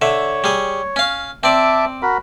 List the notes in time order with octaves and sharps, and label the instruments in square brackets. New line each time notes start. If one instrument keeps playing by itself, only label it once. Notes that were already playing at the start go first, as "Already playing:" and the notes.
[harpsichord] D3 E5 [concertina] C#5
[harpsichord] G3 G#4
C#4 F5
[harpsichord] C4 D5 [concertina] E5 A5 D6
[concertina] F#4 A#4 B5